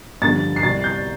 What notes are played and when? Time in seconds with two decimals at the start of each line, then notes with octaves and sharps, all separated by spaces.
0.22 G2 D3 F3 A6
0.56 C7
0.63 C2 C3 G3 A6
0.84 G6